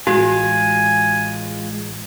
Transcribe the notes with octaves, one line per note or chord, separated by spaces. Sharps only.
A1 G#3 F4 F#4 G#5